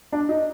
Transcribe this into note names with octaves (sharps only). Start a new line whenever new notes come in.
D4
D#4